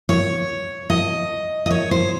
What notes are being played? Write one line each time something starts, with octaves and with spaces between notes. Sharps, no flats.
C#5
D#5
D#5
C#5
C5